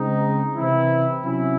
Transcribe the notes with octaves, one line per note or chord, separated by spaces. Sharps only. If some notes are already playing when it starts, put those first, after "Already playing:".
Already playing: C#3 G#3 C4 D#4
C3 E3 C4 E4
C3 F#3 C#4 E4